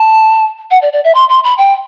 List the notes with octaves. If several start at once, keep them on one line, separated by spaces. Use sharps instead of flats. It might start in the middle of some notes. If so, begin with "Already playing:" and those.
Already playing: A5
F#5
D5
D5
E5
C6
C6
B5
G5